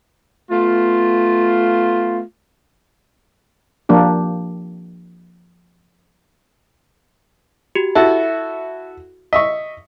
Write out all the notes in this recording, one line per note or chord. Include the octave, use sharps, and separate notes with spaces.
A3 B3 F4
F3 A#3 D4 G4
F#4 G4
E4 F#4 A4 E5
D#5 E5 C#6 B6